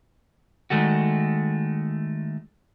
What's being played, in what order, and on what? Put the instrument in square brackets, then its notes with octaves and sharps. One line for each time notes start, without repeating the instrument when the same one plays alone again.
[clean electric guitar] D#3 G#3 A3 F#4